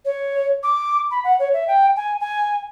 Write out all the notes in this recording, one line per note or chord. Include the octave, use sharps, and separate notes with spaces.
C#5
D6
B5
F#5
C#5
E5
G5
G#5
G#5